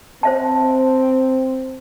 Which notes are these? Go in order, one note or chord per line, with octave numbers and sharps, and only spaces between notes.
C4 C5 E5 A5